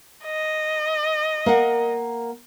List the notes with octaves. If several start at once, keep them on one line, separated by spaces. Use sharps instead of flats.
D#5
A#3 A#4 F#5